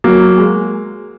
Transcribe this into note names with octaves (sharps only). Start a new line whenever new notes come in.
F#3 A#3
G#3